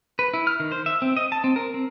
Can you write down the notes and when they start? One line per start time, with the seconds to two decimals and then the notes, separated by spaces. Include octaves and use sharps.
0.19 B4
0.34 E4
0.47 F6
0.60 D#3
0.72 C5
0.86 E5
1.02 C4
1.17 D#5
1.32 A5
1.44 C4
1.56 A#4
1.74 C4